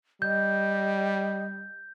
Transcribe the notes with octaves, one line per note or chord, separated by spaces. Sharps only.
G3 D#5 G6